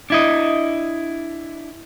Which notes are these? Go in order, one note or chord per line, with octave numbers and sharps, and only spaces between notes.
D4 E4 D#5